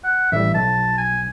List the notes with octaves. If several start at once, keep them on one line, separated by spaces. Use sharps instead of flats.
F#5
A1 G3 E5
B1 A5
G#5